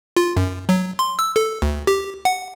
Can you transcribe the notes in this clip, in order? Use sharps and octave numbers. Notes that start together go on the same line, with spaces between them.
F4
F#2
F#3
C6
E6
A4
D2
G4
F#5